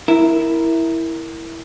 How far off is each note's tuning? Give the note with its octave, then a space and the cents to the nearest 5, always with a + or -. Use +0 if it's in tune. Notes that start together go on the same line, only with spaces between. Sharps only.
E4 -5 A#4 +0